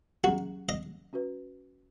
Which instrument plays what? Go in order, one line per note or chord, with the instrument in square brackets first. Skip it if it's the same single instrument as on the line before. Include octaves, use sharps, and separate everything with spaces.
[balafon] F#3 C#4 G#4 [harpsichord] F#4
[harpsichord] D#5
[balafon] C#4 F#4 B4